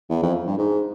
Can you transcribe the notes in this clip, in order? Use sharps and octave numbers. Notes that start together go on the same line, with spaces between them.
E2
F2
G2
G#2